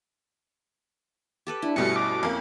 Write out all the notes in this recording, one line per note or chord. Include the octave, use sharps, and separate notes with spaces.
G4 A4 B4
D4 E4
G1 B2 G3 A3 C#4 C#7
D6
F2 A#3 C#4